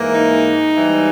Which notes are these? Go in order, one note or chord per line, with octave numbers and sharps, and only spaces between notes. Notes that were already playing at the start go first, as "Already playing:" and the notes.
Already playing: G#2 E3 A#3
D#4
G#2 E3 G3